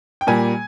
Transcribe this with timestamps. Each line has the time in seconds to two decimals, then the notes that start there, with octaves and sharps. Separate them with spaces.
0.21 G5
0.27 A#2 G3 A#3 G#5